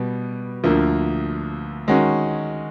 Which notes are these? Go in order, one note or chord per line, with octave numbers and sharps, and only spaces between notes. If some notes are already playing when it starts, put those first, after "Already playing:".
Already playing: B2 G3 B3
D2 D3 F3 A#3
D#3 G#3 C#4 F#4